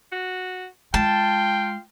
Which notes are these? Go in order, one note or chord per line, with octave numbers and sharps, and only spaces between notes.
F#4
G#3 F4 G5 A5